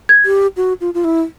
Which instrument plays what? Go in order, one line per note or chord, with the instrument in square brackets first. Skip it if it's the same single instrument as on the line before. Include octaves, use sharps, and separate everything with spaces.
[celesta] G#6
[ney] G4
F#4
F4
F4
E4